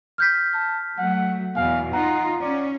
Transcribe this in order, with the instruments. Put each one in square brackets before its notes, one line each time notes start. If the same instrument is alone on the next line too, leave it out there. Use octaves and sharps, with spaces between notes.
[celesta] F6 G6 B6
[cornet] A5
[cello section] F#3 A3 [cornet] F#5
[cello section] E2 B2 E3 [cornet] F5 [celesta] G#5
[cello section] D#4 F4 [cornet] F#5 [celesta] A#5
[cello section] C#4 [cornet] D5